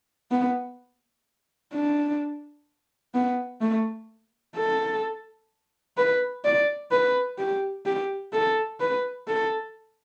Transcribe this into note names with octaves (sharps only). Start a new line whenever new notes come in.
B3
D4
B3
A3
A4
B4
D5
B4
G4
G4
A4
B4
A4